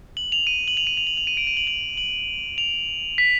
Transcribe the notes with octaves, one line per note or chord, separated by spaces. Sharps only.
F#7
F7
D#7
F#7
F7
D#7
F7
F#7
F7
D#7
D7
D#7
F#7
F7
F#7
F7
B6